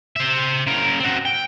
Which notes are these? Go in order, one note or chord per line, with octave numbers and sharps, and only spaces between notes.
C5 E5
C#3 A#4
C4 F#4
G5